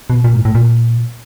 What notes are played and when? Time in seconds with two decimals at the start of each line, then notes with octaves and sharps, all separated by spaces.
0.10 B2
0.24 A#2
0.34 G#2
0.45 A2
0.55 A#2